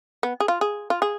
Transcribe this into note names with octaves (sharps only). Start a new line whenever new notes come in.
B3
G#4
F4
G#4
F4
G#4